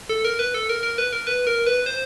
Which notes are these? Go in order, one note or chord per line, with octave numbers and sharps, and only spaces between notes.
A4
A#4
B4
A4
A#4
A#4
B4
A#4
B4
A#4
B4
C5